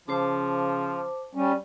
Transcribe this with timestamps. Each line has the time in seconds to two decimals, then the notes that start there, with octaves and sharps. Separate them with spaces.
0.08 C#3 F3 C5 A5 D6
1.35 G3 C#4